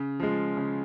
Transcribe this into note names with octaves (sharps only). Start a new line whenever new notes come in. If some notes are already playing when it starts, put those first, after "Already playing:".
Already playing: C#3
F3 G#3
C#3